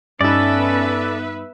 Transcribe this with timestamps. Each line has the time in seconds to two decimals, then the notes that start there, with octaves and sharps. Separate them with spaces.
0.21 G2 B3 C#4 D#4 A4 B4 D5 E5